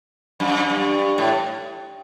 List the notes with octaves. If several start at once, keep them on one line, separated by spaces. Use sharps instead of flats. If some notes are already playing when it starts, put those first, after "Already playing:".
F#2
G2
A2